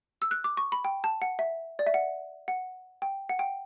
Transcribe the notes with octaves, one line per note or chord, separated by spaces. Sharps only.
E6
F#6
D6
C#6
B5
G5
A5
F#5
E5
D5
E5
F#5
F#5
G5
F#5
G5